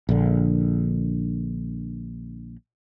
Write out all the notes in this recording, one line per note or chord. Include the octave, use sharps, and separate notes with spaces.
A#1 D3